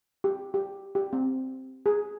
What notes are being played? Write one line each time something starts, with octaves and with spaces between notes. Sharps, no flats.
G4
G4
G4
C4
G#4